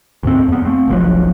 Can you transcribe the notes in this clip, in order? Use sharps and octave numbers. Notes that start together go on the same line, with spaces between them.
D2 G#2 C4
F2 B3
A3 C4
F1 B1 F3 F#3